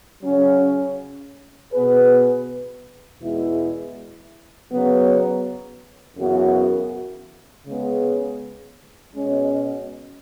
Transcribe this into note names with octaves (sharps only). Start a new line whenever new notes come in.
C#3 F#3 C#4
B2 B3 G#4 B4
E2 B2 G#3 E4
C#3 F#3 B3
F#2 C#3 E3 B3 F#4
C#3 G#3 B3
B2 G#3 C#4